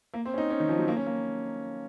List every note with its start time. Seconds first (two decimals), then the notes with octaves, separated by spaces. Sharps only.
0.14 A#3
0.25 C4
0.34 C#4
0.38 D#4
0.50 C#4
0.60 D#3
0.69 F3
0.78 F#3
0.88 A#3
0.97 C#4
1.06 A#3